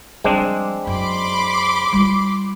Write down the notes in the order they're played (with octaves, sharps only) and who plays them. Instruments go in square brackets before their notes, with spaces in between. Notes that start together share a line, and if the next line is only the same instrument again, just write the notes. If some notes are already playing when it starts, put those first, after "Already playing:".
[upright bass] F3 G3 [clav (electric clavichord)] G#3 C4 D4
[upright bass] F#2 [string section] B5 C6 D6
[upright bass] G3 F4